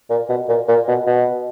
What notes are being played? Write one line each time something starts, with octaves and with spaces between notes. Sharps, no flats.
A#2
B2
A#2
A#2
B2
B2